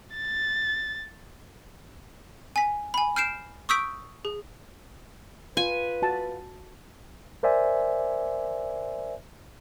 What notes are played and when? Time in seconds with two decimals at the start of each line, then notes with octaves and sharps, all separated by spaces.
0.16 A6
2.56 G#5 B6
2.94 G#5 B5
3.16 F6 G6 C7 D7 E7
3.69 C#6 D#6 E6 G6 B6 D7
4.25 G#4
5.57 F4 B4 G#5
6.02 F#4 A5
7.43 A#4 C5 D5 E5 G#5